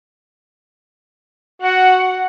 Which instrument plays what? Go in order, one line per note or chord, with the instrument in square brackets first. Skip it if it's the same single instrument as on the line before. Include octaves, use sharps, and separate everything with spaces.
[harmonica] F#4 [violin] F#5